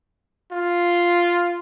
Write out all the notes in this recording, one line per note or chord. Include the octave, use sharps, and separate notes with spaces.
F4